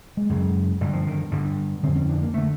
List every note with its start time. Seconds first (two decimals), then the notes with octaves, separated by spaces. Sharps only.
0.17 G#3
0.30 F#2 C#3
0.81 G2 D3 G3
0.93 F3
1.07 D#3
1.32 G2 D3 G3
1.83 F2 D3 C4
1.96 C#4
2.09 D4
2.22 A#3
2.34 D3 A3